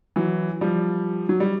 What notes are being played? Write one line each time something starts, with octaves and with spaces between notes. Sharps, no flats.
E3 F#3
F3 G3
F#3
G3